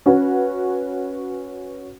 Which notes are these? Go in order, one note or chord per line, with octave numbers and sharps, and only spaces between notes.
C#4 F#4 B4